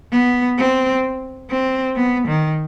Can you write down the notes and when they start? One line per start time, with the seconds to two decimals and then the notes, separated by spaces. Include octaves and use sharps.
0.12 B3
0.58 C4
1.50 C4
1.96 B3
2.28 D#3